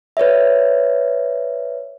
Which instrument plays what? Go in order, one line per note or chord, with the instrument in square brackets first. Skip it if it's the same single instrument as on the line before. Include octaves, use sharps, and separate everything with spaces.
[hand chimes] B4 C#5 D5 E5